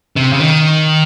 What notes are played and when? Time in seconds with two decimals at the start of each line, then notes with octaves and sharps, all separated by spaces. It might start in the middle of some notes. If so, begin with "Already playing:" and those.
0.16 C3
0.33 C#3
0.39 D#3